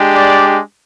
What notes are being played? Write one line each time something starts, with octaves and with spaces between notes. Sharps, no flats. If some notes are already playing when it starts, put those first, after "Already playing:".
Already playing: G#3 D4 G4
D5